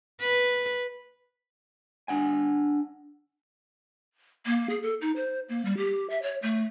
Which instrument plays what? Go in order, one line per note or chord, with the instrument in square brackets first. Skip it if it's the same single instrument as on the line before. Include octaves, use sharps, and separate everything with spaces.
[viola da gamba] B4
[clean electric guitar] D4 F#5 G#5
[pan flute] A#3
G#4
A4
D#4
C5
A#3
G3
G4
E5
C#5
A3